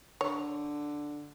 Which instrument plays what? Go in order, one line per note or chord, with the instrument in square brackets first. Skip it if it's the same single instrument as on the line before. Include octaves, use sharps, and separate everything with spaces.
[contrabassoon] D3 [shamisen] C#5